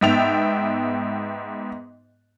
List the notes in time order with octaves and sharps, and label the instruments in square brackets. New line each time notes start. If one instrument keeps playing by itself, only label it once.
[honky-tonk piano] G#2 B3 E5 G5 A6 F7